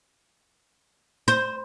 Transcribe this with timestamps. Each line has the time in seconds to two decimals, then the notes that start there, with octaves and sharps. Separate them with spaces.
1.28 C5